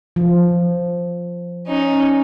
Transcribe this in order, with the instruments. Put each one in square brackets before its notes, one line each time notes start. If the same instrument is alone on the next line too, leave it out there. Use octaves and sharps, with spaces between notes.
[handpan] F3
[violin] C#4 D#4